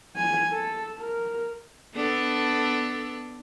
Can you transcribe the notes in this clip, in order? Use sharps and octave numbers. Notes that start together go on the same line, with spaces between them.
G#5
A4
A#4
B3 D4 A4